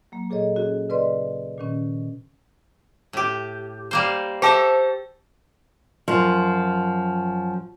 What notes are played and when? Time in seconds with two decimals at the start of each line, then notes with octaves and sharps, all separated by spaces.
0.12 F#3 A#3
0.30 A#2 G#4 A4 C#5 D#5
0.56 C#4 F#4 G#4
0.89 C#3 B4 D5 D#5 C6
1.58 A#2 D#3 C#4
3.13 A2 G4
3.91 G3 A#3 C5
4.42 G4 A4 C5 E5 A5
6.08 F#2 F3